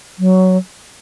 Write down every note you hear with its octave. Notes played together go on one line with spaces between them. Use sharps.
F#3